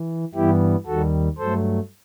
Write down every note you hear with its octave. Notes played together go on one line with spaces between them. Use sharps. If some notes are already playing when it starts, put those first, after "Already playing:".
Already playing: E3
G2 E3 G3 B3 E4 G4
D#2 D#3 G3 F#4 A4
G2 F#3 A3 A4 C5